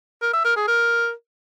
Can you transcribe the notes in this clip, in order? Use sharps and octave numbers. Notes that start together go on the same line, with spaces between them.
A#4
E5
A#4
G#4
A#4